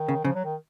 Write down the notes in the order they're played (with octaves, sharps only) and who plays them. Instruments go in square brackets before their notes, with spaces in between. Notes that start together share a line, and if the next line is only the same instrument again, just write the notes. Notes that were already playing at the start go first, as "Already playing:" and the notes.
Already playing: [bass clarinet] D#3
[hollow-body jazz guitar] C#3
[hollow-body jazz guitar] C#3 [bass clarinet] F3
[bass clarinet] F#3
D#3